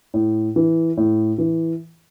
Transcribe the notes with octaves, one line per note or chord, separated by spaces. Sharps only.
A2
E3
A2
E3